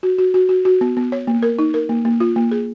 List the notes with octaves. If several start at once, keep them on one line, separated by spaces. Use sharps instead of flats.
F#4
F#4
F#4
F#4
F#4
B3
B3
C#5
A#3
A#4
D#4
A#4
A#3
A#3
F4
A#3
G#4